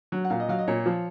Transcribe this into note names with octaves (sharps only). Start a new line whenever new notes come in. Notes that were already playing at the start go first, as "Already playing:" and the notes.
F#3
F#5
A#2 F5
D#5
F#3 F5
D#5
A#2 C#5
F3